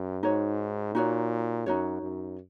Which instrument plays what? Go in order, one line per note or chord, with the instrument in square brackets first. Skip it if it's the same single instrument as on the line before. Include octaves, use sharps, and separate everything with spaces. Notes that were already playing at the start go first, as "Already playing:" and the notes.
Already playing: [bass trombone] F#2
[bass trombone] G#2 [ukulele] D#4 F#4 C#5
[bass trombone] A#2 [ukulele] D#4 F#4 C#5
[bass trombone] F#2 [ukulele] D#4 F#4 C#5
[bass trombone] F#2